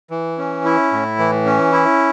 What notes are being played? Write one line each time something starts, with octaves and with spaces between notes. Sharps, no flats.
E3
C#4
E4
A2
E3
C#4
E4